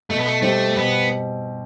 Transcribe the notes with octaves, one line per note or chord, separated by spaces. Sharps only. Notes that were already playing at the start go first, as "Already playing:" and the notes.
B2 A3
B3
A3
G3 A3 C4 G4
B2 B3